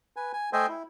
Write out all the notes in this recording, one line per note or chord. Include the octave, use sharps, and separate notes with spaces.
B4 G#5
G#5
A3 C5 D#5 E5 G5 G#5
E4